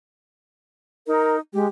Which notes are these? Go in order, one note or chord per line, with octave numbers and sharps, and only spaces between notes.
D#4 A#4
G#3 G4